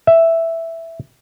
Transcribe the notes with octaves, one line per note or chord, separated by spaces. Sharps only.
E5